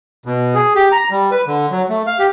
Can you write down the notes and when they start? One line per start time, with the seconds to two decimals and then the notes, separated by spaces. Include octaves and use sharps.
0.26 B2
0.55 G#4
0.75 G4
0.92 A#5
1.11 G3
1.32 B4
1.47 D3
1.71 F#3
1.89 A3
2.07 F5
2.19 G4